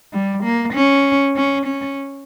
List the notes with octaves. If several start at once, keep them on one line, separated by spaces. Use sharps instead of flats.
G3
A#3
C#4
C#4
C#4